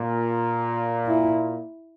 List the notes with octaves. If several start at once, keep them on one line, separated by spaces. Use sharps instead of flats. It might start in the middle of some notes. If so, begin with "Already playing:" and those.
Already playing: A#2
E4